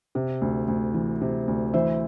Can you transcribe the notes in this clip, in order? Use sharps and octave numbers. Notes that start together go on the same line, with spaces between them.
C3
D2
D2
E3
C3
D2
E3 C5 E5